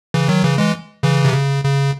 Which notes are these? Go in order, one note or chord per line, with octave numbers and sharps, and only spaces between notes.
C#3 E3
D#3 F#3
C#3 E3
E3 G#3
C#3 E3
C3
C#3
C#3